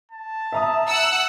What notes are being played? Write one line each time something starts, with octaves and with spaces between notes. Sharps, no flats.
A5
E5 A#5 D#6
F#5 E6 F#6